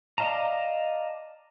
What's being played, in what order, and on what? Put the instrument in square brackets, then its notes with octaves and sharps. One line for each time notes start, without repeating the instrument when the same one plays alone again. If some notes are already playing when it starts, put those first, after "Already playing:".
[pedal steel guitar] D5 D#5 F5 A5 A#5